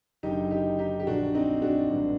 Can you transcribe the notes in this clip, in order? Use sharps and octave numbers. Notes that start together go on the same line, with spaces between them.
F#1 F#2 D3 D#4 G4
D#4 G4
D#4 G4
G4
A#1 A#2 D4 F#4
C4 D#4
D4 F#4
A1 G2 D3